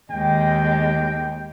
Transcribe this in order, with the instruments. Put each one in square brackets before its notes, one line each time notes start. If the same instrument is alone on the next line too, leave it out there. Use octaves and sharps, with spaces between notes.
[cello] D#2 G#3 [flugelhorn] G5